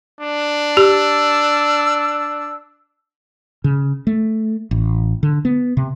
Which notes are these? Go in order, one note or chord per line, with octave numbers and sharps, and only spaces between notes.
D4
G4 E6
C#3
A3
A1
D3
B3
C3